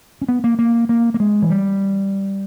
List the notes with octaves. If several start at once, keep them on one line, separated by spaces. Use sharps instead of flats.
C#4
B3
A#3
A#3
A#3
A#3
G#3
E3
G3